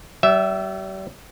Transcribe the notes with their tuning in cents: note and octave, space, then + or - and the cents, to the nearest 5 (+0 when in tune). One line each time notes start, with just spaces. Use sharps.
G3 -40 E5 +0